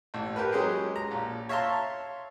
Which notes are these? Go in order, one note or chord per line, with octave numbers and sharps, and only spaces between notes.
A1
G4 A#4 B4
F#3 G#3 C#4 G4 G#4
A#5
A#1
C#5 E5 F5 A5 A#5 C6